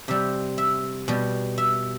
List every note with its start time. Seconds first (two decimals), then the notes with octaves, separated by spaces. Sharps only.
0.08 C3 G3 E5
0.58 E5
1.08 B2 G3
1.58 E5